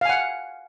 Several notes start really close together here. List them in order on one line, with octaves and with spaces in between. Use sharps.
F5 G#5 F#5